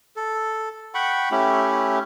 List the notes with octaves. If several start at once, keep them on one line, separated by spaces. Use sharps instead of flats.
A4
F#5 G5 B5 C#6
A3 C#4 E4 G4